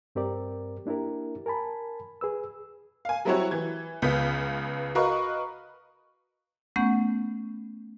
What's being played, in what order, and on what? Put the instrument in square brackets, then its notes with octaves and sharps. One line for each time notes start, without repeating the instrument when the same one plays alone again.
[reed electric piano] G2 C4 G4 A#4 D5
A#3 D4 E4 G4 A#4
A#4 G#5 A5 B5
G#4 B4 E6
[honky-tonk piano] F5 G#5
F#3 G3 C4 E4 F#4 C#5
E3 G#6
C#2 C#3 B3 G6 B6
F#4 A#4 B4 D#5 F5 C#6
[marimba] A3 B3 C#4 F#5 G6